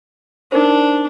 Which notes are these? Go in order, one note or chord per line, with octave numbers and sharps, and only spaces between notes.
D4 D#4 A#4 C5